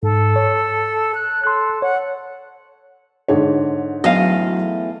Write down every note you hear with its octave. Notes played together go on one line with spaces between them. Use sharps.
G#2 A4
C#5
F#6
A4 C6 F#6
C#5 F#5
G#2 D3 C#5
E2 F#3 A3 D#5 F5